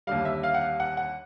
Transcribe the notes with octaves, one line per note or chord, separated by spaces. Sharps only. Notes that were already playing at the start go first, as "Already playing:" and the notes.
D#2 D3 G3 F5
E5
F5
F#5
F5
F#5
F#5